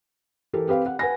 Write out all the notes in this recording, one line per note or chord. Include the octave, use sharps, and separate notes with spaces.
E3 G4 A4 A#4
C4 G4 B4 F5
F#5
B4 F#5 G#5 A#6